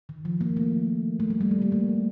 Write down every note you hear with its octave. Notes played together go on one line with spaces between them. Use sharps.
D#3
F3
A#3
A3
A3
G3
G3
A3
A#3
A3